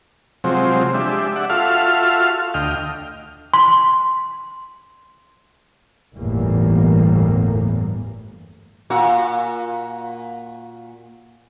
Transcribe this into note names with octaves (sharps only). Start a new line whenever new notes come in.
C3 F3 F#3 G#3 C4
G#3 D4 G4 E5
D5 E5 F#5
F4 F#4 A4 E5 F5 F6
D2 D#5 G5 F6
C6
G1 E2 A2 E3 G3 A#3
A#2 F#4